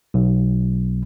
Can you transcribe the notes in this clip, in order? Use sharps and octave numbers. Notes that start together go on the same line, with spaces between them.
B1